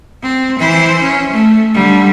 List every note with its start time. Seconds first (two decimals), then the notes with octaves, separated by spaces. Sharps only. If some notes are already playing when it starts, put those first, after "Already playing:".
0.23 C4
0.59 E3 C5
1.02 C#4
1.32 A3
1.74 D3 G3